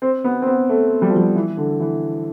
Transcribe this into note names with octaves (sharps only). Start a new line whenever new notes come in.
C4
B3
C4
B3
A3
G3
F3
G3
E3
D3
E3